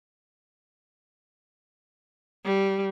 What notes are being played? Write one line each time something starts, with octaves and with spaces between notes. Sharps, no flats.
G3